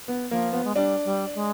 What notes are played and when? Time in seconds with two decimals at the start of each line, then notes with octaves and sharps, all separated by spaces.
0.08 B3
0.31 F3 A#3
0.53 B3
0.64 G#3
0.75 G3 D4
1.04 G3
1.35 G#3